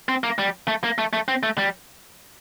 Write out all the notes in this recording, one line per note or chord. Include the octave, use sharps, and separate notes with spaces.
C4
A#3
G3
A3
A#3
A3
A3
C4
A3
G3